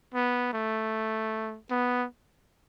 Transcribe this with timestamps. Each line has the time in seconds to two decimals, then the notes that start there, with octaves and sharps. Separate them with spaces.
0.14 B3
0.53 A3
1.70 B3